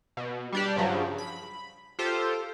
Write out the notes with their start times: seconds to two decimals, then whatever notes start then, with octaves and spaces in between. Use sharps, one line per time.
0.17 B2
0.52 G3 D4 G4
0.76 G2 C#3 F3 F#3
1.18 B5
1.99 F4 G4 A4 C5